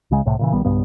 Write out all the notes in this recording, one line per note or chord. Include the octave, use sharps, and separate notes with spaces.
C#2 C#3 G#3
C2 A2 C3
A#2 C#3 E3
A#1 D#3 G3 B3
B1 G2 C#3 B3